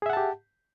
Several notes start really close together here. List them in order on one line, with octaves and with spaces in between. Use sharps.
G#4 E5 F#5 A5 G4